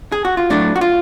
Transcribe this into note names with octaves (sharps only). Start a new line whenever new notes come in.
G#4
F#4
F4
A2 F#3 A3 D4
F#4
F4